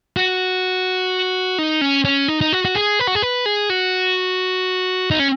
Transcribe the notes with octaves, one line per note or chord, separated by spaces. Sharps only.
F#4
D#4
C#4
C#4
D#4
D#4
F#4
F#4
G#4
B4
F#4
G#4
B4
G#4
F#4
D#4
C#4